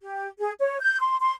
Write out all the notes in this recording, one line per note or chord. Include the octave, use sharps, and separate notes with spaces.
G4
G#4
C#5
G6
C6
C6